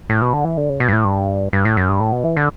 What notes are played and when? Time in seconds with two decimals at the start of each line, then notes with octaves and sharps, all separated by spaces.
0.10 A2
0.22 B2
0.33 D3
0.44 E3
0.57 D3
0.69 C#3
0.80 B2
0.88 G2
0.93 A2
1.05 G2
1.53 G2
1.65 A2
1.77 F#2
1.89 G2
2.00 A2
2.12 B2
2.24 E3
2.37 D3